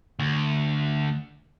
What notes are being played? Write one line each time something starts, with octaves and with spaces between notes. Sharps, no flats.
D2